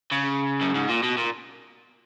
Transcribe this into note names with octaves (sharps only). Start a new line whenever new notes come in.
C#3
F#2
G#2
A#2
B2
A#2